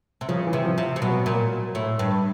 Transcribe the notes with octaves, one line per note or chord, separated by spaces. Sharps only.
C3
C#3 F3
E3
C3
F3
C3
C3
B2 F#3
A#2
A2
G2